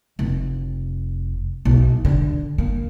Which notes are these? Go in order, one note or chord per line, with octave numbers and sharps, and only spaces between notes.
F1
B1
D3
A#3